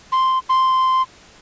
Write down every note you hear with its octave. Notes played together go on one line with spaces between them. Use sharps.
C6
C6